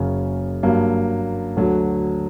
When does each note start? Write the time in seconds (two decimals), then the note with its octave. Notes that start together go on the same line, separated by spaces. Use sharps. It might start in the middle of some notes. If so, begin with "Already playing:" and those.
Already playing: F#1 F#2 C#3
0.63 G2 F#3 A#3
1.57 D2 D3 F#3